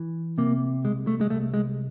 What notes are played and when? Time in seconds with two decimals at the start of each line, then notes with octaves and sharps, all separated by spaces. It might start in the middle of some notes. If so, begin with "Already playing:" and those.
Already playing: E3
0.38 C3 A#3
0.84 C2 G#3
1.07 A3
1.21 G#3
1.30 C2 A3
1.54 G#3